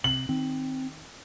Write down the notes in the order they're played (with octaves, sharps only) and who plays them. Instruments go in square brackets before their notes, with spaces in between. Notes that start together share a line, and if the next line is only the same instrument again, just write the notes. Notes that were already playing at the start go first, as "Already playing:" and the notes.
[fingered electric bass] C3 [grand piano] F#7
[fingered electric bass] D#3 [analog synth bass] C4